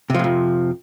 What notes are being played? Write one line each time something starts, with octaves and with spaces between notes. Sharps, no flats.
F2 A2 C3 F3